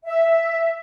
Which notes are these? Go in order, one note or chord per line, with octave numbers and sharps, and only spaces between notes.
E5